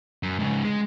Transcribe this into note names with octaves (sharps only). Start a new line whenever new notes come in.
F#2
G#2 C#3
G#3